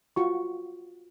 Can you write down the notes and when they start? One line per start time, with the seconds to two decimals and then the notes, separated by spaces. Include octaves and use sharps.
0.16 F4 F#4 C#6